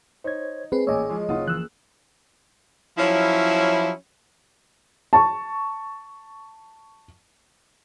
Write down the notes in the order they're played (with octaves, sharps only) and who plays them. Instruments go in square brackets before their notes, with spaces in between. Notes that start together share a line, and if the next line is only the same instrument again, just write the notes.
[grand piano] D#4 [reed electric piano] C5 C#5 G#6
[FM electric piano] C4 B4 [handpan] G#4
[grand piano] A1 A#2 [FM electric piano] C#5 D#5 [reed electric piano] G#5 D6 E6
[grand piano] F3 G#3
[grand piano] F#1 F4 D#6 [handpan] A#3 [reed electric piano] D#4 F#5
[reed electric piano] E3 F3 [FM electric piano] E6 F#6
[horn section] F3 F#3 C#4 E4
[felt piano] A5 C#6